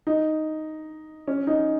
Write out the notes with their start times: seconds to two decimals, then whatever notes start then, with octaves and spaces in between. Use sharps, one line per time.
0.07 D#4
1.27 C#4
1.47 D#4